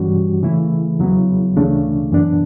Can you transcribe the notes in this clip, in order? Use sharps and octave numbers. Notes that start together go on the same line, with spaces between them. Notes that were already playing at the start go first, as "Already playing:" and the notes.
Already playing: G2 E3 G3 C#4 F#4
C#3 E3 A3 E4
E2 C#3 F#3 B3 E4
D2 C#3 E3 A3 D4
F#2 E3 B3 D4